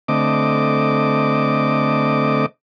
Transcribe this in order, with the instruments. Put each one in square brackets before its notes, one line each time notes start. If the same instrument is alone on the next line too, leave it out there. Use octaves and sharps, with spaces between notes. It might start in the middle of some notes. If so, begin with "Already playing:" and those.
[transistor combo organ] D3 A3 C4 D#5 D6